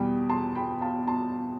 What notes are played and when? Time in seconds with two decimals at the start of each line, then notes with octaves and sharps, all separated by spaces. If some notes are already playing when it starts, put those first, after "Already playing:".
Already playing: E2 B2 G3 G5
0.29 A5 C6
0.55 G5 B5
0.81 F5 A5
1.07 A5 C6